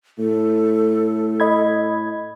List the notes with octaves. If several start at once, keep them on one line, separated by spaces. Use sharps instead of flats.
A2 A4
D#5 B5 G#6